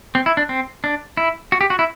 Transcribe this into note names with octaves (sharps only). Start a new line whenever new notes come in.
C4
E4
D4
C4
D4
E4
F#4
G4
F#4
E4